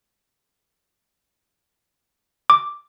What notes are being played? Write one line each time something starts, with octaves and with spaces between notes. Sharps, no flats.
D6